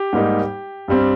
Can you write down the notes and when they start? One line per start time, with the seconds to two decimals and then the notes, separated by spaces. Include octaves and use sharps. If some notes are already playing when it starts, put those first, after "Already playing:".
Already playing: G4
0.13 G#2 G3 A#3 D#4
0.88 G2 G3 C4